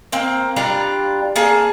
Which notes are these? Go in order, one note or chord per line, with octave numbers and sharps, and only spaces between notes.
A#3 C4
G3 D4 F4 A#5
A#3 G#4 A5